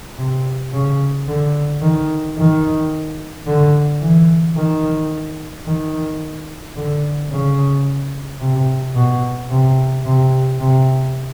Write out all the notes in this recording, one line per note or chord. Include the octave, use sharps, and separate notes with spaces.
C3
C#3
D3
D#3
D#3
D3
E3
D#3
D#3
D3
C#3
C3
B2
C3
C3
C3